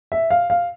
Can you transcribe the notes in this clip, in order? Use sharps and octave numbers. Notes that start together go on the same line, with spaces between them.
E5
F5
F5